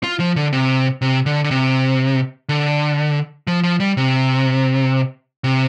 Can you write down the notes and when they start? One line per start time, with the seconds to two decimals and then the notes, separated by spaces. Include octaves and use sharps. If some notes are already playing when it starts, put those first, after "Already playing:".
0.03 F4
0.20 F3
0.36 D3
0.53 C3
1.02 C3
1.26 D3
1.44 D3
1.51 C3
2.49 D3
3.47 F3
3.63 F3
3.80 G3
3.97 C3
5.44 C3